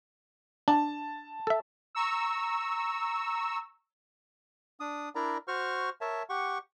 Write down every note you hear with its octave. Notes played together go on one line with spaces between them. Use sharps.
D4 A5
A4 E5
A#5 C#6 E6
D4 D#6
D4 E4 A#4 D5 A#5
F#4 C5 C#6 F6
A#4 C#5 E5 A5
G4 F#5 C#6